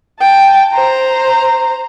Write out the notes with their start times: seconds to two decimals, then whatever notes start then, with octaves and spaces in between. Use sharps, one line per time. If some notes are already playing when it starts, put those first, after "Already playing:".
0.20 G5 A5
0.73 C5 A#5